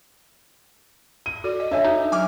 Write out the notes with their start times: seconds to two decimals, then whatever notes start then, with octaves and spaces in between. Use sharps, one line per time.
1.26 D#7
1.44 F#4 A4 D5
1.60 D#5
1.71 D4 C#5 E5 G#5
1.84 D#4 F#4
2.12 F#3 G#5 D6 F6